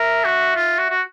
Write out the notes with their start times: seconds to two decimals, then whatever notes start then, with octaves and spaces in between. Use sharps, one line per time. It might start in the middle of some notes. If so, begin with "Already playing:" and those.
Already playing: A#4 E5
0.25 F#4
0.56 F4
0.78 F#4
0.90 F#4